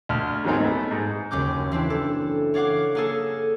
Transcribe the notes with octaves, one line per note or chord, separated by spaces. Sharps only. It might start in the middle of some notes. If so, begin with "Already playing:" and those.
D2 A5 F6
G#2 D#3 F#3 G#3 C4 D#4
A3 B3
G#2
F#1 D#2 C#4 D6 G6
E3 C4 D4 E4
A4
C#5 D5 F5 F#5 D6
A#3 G#4 A4